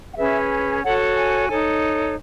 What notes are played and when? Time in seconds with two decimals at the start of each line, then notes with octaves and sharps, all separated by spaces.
0.12 F#5
0.17 C#4 G#4 B4 E5
0.83 F#4 A4 C#5 F#5
1.15 G#5
1.49 D#4 A4 C#5